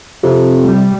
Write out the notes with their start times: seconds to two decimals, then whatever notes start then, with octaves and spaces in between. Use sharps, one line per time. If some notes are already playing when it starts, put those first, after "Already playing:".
0.23 F2 C3
0.62 G3